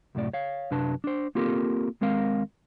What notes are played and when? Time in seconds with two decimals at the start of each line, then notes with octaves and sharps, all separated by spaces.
0.15 C2 F#2 A2 D5
0.33 C#5 F5
0.71 F#2 C3 D4 B4 A5
1.04 D4 C5
1.35 A#3 C4 F4 G4 A4 A#4
2.01 D#2 G#3 C4 A#4 F5